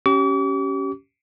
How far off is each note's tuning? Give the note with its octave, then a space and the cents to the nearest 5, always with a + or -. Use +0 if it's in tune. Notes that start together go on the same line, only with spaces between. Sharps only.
C#4 +0 G4 -25 D6 -45